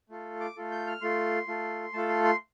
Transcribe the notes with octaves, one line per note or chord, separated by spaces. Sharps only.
A3 F4 A4
D6
A3 F4 A4
G6
F6
A3 F4 A4 C6
A3 F4 A4
A3 F4 A4 A5
C6
C6